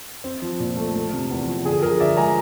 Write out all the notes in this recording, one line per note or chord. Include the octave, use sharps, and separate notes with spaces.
C4
F3
A#2
A3
A3
C3
E2
F3
D3 G#4
F3 G#4 A#4
D3 D5 E5
G#3 G#5 A#5